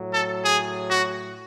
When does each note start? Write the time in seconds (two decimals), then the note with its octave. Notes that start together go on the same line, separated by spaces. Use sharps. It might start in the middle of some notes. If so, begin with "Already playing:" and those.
Already playing: A2 F#3
0.12 A4
0.43 G#4
0.89 F#4